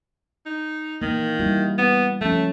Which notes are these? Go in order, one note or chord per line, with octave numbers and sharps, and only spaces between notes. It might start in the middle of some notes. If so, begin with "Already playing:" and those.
D#4
D#3 E3 A#3
G3 E4 F#4
B3
F3 A3 C#4